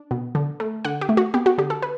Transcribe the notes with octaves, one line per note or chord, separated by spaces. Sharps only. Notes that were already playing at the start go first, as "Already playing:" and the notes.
Already playing: D4
B2
D3
A3
D3 F#5
G4
A3
F#4
B3 G4
F#4
D3 G4
A4
B4